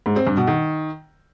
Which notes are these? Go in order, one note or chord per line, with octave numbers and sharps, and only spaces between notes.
G#2
C4
G2
B2
D#3